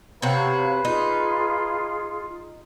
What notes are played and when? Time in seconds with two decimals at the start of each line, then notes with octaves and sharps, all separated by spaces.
0.22 C3 F#4 B4 C#5 F5
0.85 D#4 F4 G#4